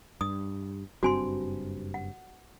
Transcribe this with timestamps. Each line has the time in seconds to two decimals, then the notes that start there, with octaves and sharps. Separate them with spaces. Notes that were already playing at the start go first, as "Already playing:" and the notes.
0.21 G2 D#6
1.03 F#1 G2 C4 F#4 G#5 C6
1.94 F#5